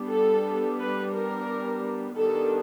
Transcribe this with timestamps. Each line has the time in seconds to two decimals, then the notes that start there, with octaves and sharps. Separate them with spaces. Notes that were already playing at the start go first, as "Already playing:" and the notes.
Already playing: G3 B3 D4
0.11 A4
0.79 B4
1.14 A#4
2.18 D#3 G3 B3 D4 A4